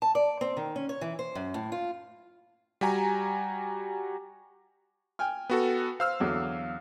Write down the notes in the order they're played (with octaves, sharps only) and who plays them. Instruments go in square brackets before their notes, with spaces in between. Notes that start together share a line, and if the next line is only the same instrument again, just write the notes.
[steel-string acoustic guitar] A5
D5
C4
D#3
C#4
C#5
E3
C5
F#2
A2
F4
[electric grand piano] G3 F#4 G#5 A#5
[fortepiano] G5 G#5 F6
[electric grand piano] B3 F#4 A4
[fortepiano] C5 [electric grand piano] F5 E6 F6
[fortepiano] E2 D3 F#3